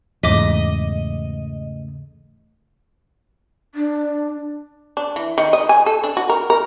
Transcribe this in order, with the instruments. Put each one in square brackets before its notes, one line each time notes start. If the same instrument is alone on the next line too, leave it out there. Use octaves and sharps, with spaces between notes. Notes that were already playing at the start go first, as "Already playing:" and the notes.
[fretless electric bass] E2 G#2 [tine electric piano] C#3 A3 [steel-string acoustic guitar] D#5 [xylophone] D6 B6
[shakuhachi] D4
[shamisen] D4
E3
D#3
D#5
G#5
A4
D4
F#4
A#4
A#4